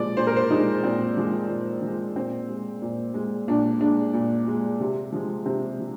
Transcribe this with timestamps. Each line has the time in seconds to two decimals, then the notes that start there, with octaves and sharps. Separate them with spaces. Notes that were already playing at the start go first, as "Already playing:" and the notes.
Already playing: A#2 F3 G#3 D5
0.17 A#2 C5
0.27 A#4
0.36 C5
0.50 F3 G#3 D#4
0.84 A#2 C4
1.17 F3 G#3
1.49 A#2
1.82 F3 G#3
2.16 A#2 C4
2.49 G#3
2.82 A#2
3.14 G#3
3.48 A#2 D4
3.80 G#3 D4
4.13 A#2
4.47 G#3
4.80 C3
5.12 F3 G#3
5.45 C3 C4
5.79 F3